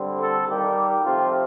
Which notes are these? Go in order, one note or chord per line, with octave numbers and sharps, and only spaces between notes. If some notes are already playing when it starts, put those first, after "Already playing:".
Already playing: D3 G3 C4
A4
D#3 G3 A#3 G4
C3 F3 A3 C4 F4